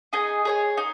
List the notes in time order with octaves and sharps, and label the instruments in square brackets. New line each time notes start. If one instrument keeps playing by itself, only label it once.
[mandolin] D#4 G#4 D#5 G#5
G#4 C#5 G#5
D#4